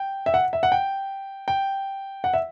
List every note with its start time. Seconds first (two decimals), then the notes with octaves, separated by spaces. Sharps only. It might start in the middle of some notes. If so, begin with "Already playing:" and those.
Already playing: G5
0.26 E5
0.34 F#5
0.53 E5
0.63 F#5
0.72 G5
1.48 G5
2.24 F#5
2.34 E5